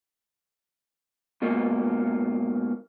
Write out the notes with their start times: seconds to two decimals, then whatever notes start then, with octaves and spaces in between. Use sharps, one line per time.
1.42 G#2 B2 A#3